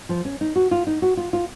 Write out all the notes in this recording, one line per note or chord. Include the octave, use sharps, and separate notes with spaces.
F3
C#4
D#4
F#4
F4
D#4
F#4
F4
F4